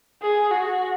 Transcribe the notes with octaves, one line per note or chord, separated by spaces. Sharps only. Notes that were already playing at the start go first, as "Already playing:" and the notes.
G#4
F#4